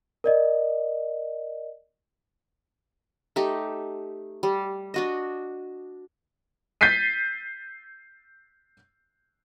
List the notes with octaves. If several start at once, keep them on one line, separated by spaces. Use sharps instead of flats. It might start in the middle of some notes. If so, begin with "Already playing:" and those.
A#4 D5 D#5
A3 D#4 G4
G3
D4 F#4 D#5
G6 A6 B6 C7 D#7